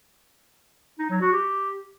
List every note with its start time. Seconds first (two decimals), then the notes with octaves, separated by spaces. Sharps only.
0.99 D#4
1.10 F#3
1.21 F#4
1.32 G4